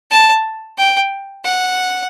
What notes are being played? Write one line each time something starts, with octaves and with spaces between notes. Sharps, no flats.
A5
G5
F#5